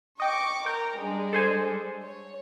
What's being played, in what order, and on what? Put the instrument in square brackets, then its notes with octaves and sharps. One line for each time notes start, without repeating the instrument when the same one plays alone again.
[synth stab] D#5 G5 [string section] C#6 D6
[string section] A#4 A#5 [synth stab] G5
[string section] G3 G#3 D4
[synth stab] A4 C5 G#5
[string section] C#5